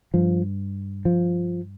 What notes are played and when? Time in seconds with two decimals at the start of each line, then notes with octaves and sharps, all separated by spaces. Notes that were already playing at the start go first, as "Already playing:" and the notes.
0.14 G2 F3
1.05 F3